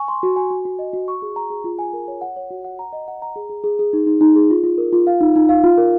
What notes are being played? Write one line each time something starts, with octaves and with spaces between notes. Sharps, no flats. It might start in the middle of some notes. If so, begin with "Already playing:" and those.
Already playing: G#5 C#6
C6
F#4
G#5
F#4
F#4
D#5
F#4
C#6
G#4
A#5
G#4
F4
G#5
A#4
C#5
F#5
C#5
F#4
F#5
A#5
D#5
F#5
A#5
G#4
G#4
G#4
G#4
D#4
D#4
D#4
G#4
F4
F4
A#4
F4
F5
D#4
D#4
F5
F4
A#4